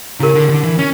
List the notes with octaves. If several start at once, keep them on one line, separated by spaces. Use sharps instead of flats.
C#3 E4 G4 A#4
D3
D3
E3
C#4